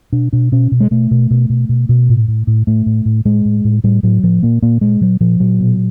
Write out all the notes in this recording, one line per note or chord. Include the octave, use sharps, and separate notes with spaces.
B2 D4
B2 D4
B2 C#4
B2
G#3
B2 A3
B2
B2
B2
B2
B2
A2
A2
A2
A2 A3
A2
A2
A2 G#3
A2
A2
A2 G3
A2 F#3
A2 F3
A#2 A#3
A#2 A#3
A#2 G#3
A#2 F#3
A#2 F3
A#2 F#3
B2